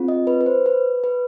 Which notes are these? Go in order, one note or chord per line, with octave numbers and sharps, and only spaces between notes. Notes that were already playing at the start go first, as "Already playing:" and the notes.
Already playing: C4 F4 G#4
D#5
B4
B4
C5
B4
B4